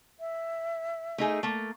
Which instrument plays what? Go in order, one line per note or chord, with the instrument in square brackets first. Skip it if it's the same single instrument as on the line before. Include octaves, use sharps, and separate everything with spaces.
[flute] E5
[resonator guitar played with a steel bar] A3 D#4 G#4
A3 A#3